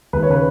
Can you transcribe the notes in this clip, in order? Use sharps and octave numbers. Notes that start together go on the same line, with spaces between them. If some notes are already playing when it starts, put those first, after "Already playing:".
D#2 B4
C#5
C#3 B4